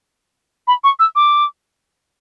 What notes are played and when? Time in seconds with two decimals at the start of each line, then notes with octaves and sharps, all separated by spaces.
0.67 B5
0.84 C#6
0.99 E6
1.16 D6